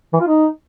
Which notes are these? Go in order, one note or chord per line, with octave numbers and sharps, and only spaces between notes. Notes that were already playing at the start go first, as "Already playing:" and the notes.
E3
F4
D#4